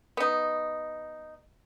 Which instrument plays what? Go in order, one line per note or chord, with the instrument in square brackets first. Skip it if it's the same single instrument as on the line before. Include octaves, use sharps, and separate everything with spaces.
[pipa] B3 D#4